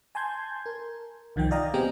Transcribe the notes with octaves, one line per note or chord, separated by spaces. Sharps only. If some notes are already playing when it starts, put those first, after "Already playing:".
G#5 A5 C6 G6 G#6
A#4
C2 D#3 F3 D#4 G5
D5 D#5 F5 G5 A#5 D#6
B3 C4 G4 G#4 G5 G#5